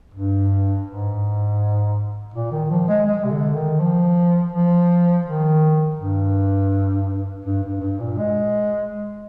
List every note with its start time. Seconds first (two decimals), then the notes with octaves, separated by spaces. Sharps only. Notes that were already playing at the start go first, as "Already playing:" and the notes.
0.14 G2
0.87 G#2
2.34 A#2
2.52 D#3
2.70 F3
2.88 G#3
3.06 G#3
3.24 C3
3.31 D3
3.55 D#3
3.80 F3
4.52 F3
5.26 D#3
5.99 G2
7.45 G2
7.63 G2
7.81 G2
8.00 A#2
8.18 G#3